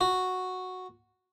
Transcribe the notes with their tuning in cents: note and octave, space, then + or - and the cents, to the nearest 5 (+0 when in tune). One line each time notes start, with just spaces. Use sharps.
F#4 -5